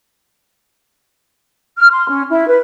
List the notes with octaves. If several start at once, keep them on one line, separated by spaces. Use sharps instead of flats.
F6
C6
C#4
E4
B4